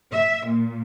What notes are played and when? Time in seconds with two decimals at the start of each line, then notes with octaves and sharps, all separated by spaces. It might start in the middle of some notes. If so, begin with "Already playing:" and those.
0.11 E5
0.46 A#2